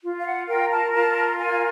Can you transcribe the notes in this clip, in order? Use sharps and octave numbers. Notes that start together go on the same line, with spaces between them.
F4
F5
F#5
A#4 G5
A5
F4 A5
A#4 G#5